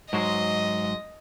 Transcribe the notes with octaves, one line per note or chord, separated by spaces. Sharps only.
G#2 F#3 G#3 D#5